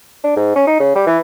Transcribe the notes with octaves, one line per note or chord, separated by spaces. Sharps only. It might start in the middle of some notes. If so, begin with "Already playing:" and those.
D4
G#2
C#4
D#4
C#3
G3
E3